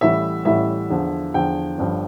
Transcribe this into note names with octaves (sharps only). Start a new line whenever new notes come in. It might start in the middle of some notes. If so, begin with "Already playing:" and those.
A1 A2 E3 G3 E5
A1 A2 E3 G3 E5
E2 D3 F3
E2 D3 F3 G5
G1 G2 F3